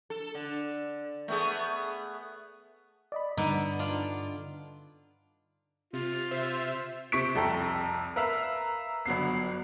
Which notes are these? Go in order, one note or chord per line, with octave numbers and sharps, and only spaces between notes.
A4
D3
A3 B3 G#4
D5 D#5 B5
G2 D3 B3 D#4
D4 F4
C3 F4
C3 C5 E5
C3 C4 C#6 B6 D7
C2 F2 A4 G5 A#5
A#4 B4 E5 F5 A#5
G1 F#3 B3 C7